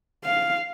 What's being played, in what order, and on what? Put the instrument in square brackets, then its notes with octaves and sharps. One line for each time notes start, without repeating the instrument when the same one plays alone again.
[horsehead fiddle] F5